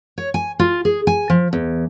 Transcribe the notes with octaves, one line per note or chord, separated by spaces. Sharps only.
C#5
G#5
F4
G#4
G#5
F3
E2